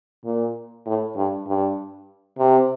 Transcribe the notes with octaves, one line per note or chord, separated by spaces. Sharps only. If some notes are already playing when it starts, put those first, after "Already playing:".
A#2
A2
G2
G2
C3